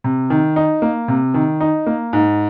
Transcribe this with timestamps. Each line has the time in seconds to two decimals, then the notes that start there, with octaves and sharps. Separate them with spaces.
0.04 C3
0.30 D#3
0.56 D#4
0.82 A#3
1.08 C3
1.34 D#3
1.60 D#4
1.87 A#3
2.13 G#2